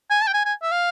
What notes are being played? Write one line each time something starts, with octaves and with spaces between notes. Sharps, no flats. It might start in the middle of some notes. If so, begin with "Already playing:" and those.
G#5
A5
G5
G#5
G#5
E5
F5